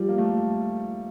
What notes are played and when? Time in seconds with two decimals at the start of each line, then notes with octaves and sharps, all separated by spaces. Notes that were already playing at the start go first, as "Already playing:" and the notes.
Already playing: F3 G3
0.09 A#3
0.18 A3